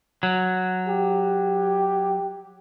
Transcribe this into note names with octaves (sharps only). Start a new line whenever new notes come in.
F#3
G4